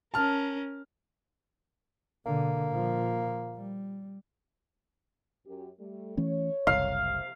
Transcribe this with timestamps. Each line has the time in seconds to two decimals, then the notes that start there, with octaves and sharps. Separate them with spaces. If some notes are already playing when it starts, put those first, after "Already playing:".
0.14 C#4 A#4 A5 F6
2.26 B2 D3 A#3
2.69 A#2 F3
3.56 G3
5.46 F#2 G4
5.79 G3 A3
6.17 E3 A3 C#4 C#5
6.67 F#1 C2 F5
7.01 C3